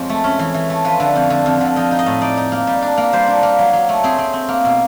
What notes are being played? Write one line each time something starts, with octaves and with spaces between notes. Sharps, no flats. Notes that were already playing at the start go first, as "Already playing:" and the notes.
Already playing: F2 G#3 C#5
A3
C#4
E3
E3
A3
F3 B4
D3
F2
D3
F2
D3
F3 D#5
D#4
D#5
A2
D#4 D5
D#4
A#3
G3
D4
A#3
G3 C5
D4
A#3
F#3
F#3
A3
C4 G#4
C4
C4
A#3
B2